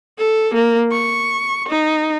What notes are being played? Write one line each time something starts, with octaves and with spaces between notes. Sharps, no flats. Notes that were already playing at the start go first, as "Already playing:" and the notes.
A4
A#3
C#6
D#4